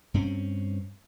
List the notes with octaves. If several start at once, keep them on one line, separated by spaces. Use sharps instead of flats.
G2 C4 C#4